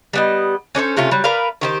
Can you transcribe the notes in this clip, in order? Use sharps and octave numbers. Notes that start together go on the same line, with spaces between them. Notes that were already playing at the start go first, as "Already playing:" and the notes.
G3 B3 D#5
C#4 D4 A4 C5
C3 A3 C#4 F4
F#3 G3
A#4 B4 D5 F5
D#3 G4 C5